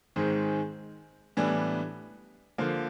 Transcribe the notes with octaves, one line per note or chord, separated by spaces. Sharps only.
G#2 D#3 G#3 C4
A2 E3 G3 B3 D4
D3 F3 A#3